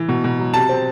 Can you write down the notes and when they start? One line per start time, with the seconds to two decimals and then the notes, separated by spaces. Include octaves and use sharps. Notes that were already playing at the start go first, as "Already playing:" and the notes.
Already playing: E3
0.08 B2
0.24 B2
0.39 F#3
0.54 C3 A5
0.69 C4